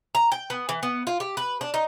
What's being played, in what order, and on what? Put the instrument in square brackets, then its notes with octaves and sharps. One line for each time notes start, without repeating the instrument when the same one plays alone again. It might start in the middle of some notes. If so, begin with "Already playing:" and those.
[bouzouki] A#5
G5
B3
E3
B3
F4
G4
B4
D4
D#4